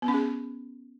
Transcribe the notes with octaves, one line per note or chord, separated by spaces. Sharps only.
B3
C#4
G#4